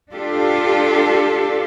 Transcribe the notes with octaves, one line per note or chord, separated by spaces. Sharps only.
D4 F4 G4 A4